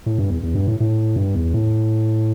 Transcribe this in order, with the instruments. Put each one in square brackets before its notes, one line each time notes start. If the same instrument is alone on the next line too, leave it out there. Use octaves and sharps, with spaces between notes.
[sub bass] A2
G2
E2
E2
G2
A2
A2
G2
E2
A2